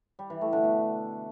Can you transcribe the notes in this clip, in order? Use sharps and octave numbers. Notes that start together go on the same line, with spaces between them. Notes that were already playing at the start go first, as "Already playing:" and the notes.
G3
E3
A3
D3
B2